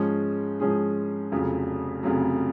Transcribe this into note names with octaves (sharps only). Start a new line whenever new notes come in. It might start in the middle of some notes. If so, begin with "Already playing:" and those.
Already playing: G#2 F3 G#3 C#4 G#4
G#2 F3 G#3 C#4 G#4
F1 F2 C#3 F#3
F1 F2 C#3 F#3